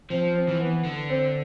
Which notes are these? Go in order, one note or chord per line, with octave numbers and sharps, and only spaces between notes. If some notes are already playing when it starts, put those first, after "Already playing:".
F3 C4
C4
E3
B3
D3
C4